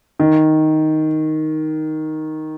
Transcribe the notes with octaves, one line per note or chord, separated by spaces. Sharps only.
D#3